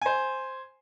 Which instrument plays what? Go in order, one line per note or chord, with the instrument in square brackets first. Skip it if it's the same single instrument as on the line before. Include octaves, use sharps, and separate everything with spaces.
[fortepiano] C5 G#5